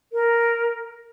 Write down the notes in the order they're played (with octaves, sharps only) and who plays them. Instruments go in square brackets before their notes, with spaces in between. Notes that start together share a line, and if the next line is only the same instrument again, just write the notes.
[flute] A#4